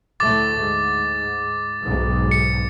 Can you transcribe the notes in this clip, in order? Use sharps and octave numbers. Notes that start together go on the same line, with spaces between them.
D2 A2 A3 D6 A6
G#2
B1 G#2
C#7